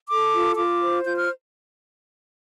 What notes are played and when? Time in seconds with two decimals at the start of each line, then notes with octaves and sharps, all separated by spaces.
0.09 A4 D6
0.33 F4
0.56 F4 D6
0.80 C5
1.03 F4 G6
1.16 F6